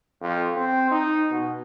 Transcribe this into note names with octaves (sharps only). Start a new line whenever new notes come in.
F2
C4
D#4
B2